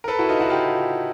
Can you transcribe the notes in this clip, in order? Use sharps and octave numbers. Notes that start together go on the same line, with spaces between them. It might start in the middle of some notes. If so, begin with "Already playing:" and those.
A#4
A4 B4
E4 F#4
D#4 F4
E4 F#4
F4 G4